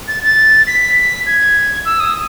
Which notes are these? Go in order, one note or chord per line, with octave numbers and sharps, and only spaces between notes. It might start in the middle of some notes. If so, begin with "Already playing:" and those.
A6
A6
B6
G#6
E6
D#6